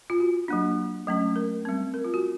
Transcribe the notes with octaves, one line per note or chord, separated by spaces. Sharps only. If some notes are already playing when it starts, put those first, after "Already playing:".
F4
F#4
F#3 A#3 D4
F#3 A3 C#4
A#4
G3 C4
A#4
F4
F#4